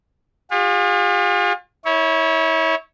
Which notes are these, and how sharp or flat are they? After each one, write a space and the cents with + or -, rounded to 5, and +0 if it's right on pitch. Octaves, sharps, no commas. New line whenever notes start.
F4 +35 G#4 -45
E4 -30 C#5 +0